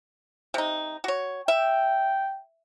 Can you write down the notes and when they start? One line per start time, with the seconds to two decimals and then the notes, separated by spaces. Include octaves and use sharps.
0.54 C3 D#4
1.04 F#4 C#5
1.48 E5 G5